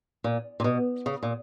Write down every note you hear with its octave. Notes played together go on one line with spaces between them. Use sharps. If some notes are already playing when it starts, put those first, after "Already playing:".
A#2
A#2
B2
C#3
A#2